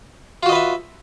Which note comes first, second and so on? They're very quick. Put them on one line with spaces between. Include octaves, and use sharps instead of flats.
F4 F#4 D#5 B4 E5